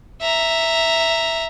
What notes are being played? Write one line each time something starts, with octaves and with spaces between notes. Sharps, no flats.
E5 A#5